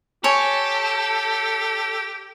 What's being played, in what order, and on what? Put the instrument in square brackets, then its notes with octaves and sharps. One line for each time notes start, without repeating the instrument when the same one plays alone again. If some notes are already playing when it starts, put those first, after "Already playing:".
[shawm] G4 [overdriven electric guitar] A4 [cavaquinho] C#5 G#5